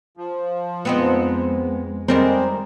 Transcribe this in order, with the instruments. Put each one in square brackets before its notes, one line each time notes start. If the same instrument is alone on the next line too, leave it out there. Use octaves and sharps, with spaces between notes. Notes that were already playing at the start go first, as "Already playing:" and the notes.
[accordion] F3
[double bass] F2 G#3 [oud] B3 C4 D#4
[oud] D#3 G3 A#4 [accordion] G#3 [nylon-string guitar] C4